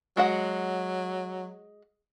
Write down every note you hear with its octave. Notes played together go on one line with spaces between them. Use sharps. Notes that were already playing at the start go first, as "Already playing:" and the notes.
F#3 G#3 F#4 F#5